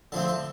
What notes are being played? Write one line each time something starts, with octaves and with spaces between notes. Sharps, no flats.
D3 F3 A3 C4 A5
A5